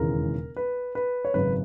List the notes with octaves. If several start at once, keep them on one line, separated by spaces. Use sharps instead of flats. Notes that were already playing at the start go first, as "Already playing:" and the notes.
Already playing: E1 D#2 C#3 E3 G#3 A#4
B4
B4
C#5
G#1 F#2 C#3 B4